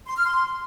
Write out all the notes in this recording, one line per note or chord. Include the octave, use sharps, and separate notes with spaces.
C6
F6
C6